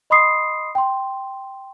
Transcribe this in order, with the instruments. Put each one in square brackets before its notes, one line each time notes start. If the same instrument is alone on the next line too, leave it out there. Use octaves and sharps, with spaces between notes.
[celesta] D#5 B5 C6 D#6 C7
G5 C6